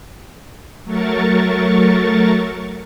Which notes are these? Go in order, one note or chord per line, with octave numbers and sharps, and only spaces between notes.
F#3 A3 A#4 C#6 A6